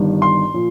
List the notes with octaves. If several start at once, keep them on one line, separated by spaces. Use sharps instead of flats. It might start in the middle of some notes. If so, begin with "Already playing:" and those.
Already playing: G1 G2 D#3
C6
A#2 F3